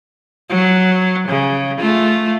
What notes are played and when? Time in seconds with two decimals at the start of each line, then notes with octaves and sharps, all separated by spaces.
0.49 F#3
1.28 C#3
1.79 A3 F4